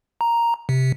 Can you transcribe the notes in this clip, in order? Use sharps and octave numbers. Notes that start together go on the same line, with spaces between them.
A#5
C3